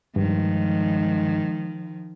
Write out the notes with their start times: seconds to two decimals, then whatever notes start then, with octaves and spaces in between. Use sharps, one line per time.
0.16 G2 D#3 F3 G#3